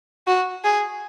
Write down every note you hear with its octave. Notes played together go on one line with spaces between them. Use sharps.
F#4
G#4